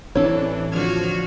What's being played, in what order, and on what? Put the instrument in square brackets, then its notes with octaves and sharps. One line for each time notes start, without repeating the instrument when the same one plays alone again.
[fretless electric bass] A1 C4 [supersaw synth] E3 D4 [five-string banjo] A4 C#5
[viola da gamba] D3 F#4 [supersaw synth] F3 F6 G#6